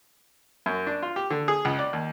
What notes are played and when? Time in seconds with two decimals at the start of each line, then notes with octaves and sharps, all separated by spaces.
0.66 F#2
0.87 D4
1.03 F4
1.16 G4
1.30 D3
1.48 G#4
1.65 C#2
1.79 D5
1.93 D#2